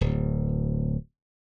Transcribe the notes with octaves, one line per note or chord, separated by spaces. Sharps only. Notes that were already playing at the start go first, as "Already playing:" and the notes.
D1